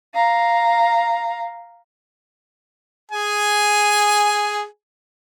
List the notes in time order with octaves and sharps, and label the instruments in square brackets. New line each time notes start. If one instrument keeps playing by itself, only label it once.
[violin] F5 A#5
[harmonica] G#4 G#5